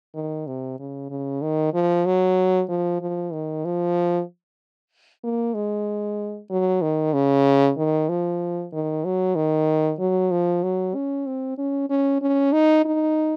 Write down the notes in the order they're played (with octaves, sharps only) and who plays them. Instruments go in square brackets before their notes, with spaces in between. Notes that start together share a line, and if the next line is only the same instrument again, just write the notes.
[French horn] D#3
C3
C#3
C#3
D#3
F3
F#3
F3
F3
D#3
F3
A#3
G#3
F#3
D#3
C#3
D#3
F3
D#3
F#3
D#3
F#3
F3
F#3
C#4
C4
C#4
C#4
C#4
D#4
D#4